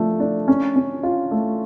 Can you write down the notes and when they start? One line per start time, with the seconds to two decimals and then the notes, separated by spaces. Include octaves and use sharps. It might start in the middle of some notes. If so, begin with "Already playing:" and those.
Already playing: F3 A3 D4
0.20 D4
0.48 C#4
0.76 C#4
1.03 F4
1.31 A3